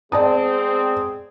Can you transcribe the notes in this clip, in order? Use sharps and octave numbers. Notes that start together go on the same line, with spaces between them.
G#3 B3 C4 G#4 D5 A5 D#6